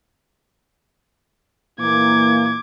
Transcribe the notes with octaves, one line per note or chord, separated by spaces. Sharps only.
A#2 E3 A#3 D6 G#6